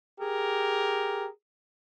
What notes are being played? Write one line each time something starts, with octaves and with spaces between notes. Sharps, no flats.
G4 G#4 A#4